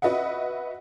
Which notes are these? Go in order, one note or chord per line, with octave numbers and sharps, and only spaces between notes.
F#4 B4 D#5 E5 F#5